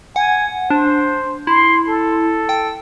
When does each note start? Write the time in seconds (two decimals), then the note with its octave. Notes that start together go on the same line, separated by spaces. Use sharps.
0.16 F#5 G#5
0.70 D4 C5
1.47 E4 C6
1.88 A4
2.49 G5